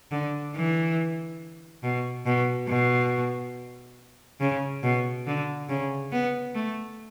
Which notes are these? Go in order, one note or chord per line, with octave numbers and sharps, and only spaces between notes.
D3
E3
B2
B2
B2
C#3
B2
D3
C#3
B3
A3